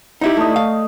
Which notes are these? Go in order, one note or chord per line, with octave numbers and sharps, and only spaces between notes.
D#4 E4 G4
A3 D#5
F5